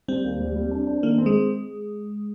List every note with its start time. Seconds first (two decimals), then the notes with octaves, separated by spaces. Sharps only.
0.08 G3 C4
0.24 D#2
0.40 G3
0.56 G3
0.71 D4
0.87 D4
1.03 D#3 A#3
1.18 C4
1.26 G#3